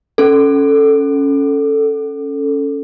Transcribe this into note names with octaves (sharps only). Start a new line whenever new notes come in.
C#4 A4